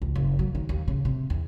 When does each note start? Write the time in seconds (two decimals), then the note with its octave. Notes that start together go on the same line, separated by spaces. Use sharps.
0.02 C#2
0.15 F#1
0.39 F#3
0.55 D#3
0.69 D#2
0.88 C#3
1.05 C3
1.30 E2